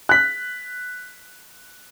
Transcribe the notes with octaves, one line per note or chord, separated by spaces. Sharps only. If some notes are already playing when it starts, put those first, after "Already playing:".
F#6 B6